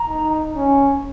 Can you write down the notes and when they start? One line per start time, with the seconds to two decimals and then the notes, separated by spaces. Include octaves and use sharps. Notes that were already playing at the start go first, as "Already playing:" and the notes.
Already playing: A#5
0.09 D#4
0.56 C#4